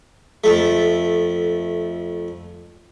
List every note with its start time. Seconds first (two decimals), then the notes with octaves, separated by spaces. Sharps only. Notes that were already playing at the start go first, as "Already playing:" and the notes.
0.44 F2 A3